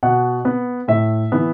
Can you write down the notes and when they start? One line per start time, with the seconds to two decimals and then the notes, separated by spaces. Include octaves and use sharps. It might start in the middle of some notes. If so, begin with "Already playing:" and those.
0.03 B2 F#5
0.45 B3
0.88 A2 E5
1.32 E3 B3